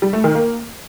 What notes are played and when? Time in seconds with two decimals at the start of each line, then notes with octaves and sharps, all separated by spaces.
0.02 G3
0.13 A3
0.24 D#3
0.35 A#3